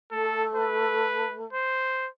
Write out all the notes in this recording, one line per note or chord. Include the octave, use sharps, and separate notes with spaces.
A3 A4
B4
C5